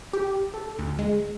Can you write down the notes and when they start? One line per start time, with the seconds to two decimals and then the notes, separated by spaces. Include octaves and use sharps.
0.13 G4
0.54 A4
0.79 D2
0.99 G#3